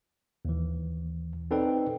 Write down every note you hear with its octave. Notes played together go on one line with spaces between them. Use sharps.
D#2 E3
C4 D#4 A4 B4 D5 G5